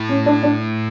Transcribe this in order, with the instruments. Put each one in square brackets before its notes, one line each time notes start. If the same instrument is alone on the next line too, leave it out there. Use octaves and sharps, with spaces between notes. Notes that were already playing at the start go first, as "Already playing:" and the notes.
Already playing: [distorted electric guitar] A2
[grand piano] C#4
D4
D4